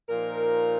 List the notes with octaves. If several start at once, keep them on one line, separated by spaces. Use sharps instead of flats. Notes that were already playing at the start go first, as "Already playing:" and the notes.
A#2 F3 A#3 D#4 A#4